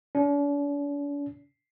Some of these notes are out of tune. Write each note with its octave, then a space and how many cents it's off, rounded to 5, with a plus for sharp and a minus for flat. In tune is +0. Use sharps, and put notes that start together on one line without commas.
D4 -45